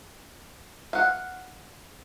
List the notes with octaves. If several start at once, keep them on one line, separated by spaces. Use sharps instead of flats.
F5 F#5